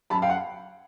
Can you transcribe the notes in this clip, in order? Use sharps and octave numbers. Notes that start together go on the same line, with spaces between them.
F#2 A5 B5
F5 G5
F#5